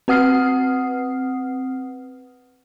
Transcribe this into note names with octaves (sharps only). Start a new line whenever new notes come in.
C4 B4 F#5 D#6 F6 C7